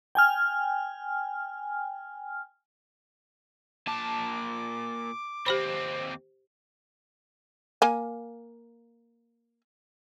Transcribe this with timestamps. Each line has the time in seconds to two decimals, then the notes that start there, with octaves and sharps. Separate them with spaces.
0.15 G5 G#5 F6
3.87 A#2 A5 D6
5.46 D#2 C4 G4 C5 B5
7.82 A#3 G#5